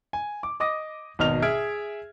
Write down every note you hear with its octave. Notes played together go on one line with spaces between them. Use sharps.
G#5
D6
D#5 D6 D#6 A#6
G#1 B2 D#4 F6 F7
G#4 E5 F6 G#6 D7